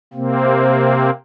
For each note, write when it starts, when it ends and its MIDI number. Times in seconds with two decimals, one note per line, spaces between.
0.14 1.10 48
0.14 1.10 58
0.14 1.10 60